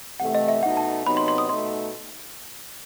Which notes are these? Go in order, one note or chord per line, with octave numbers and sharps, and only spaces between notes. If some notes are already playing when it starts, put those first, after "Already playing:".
C3 E3 A3 F#5
D#5
E5
B2 A3 D#4 F#5
A5
C3 F#3 B3 D#4 B5
C6
C6
D#6
B2 A3 D#4 C6